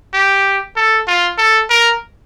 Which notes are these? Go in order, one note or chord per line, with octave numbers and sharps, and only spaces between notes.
G4
A4
F4
A4
A#4